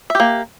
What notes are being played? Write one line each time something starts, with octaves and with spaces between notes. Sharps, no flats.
A#3 G4 E5